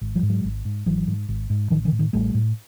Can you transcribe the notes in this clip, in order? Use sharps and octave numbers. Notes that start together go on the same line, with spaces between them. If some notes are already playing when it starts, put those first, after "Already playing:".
G#1
F3 G3
G#2
F#3 G#3
G#1
G#2
G#1 E3 F#3
G#2
G#1
G#2
A1 D#3 F3
D3 E3
A2
D#3
A1 G3 A3
A2